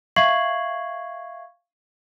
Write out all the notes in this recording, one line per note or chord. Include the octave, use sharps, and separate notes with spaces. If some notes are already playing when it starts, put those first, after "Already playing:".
E5 F5 C#6 G#6 C7 F#7